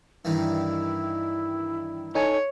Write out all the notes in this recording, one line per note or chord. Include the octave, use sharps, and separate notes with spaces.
G2 D#3 E3 E4
D#4 A4 C#5 G#5